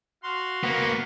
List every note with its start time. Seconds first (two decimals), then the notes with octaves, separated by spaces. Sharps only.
0.23 F#4 F5 C6
0.64 A#3 B3